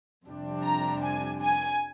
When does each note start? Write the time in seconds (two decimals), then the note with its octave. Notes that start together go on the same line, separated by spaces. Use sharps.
0.25 F2 C3 G3 D4
0.64 A#5
1.03 G#5
1.43 G#5